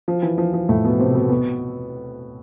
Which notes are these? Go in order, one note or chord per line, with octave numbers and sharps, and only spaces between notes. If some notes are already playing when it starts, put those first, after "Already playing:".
F3
E3
F3
F3
A2 A3
B2 B3
C3 C4
B2 B3
B2 B3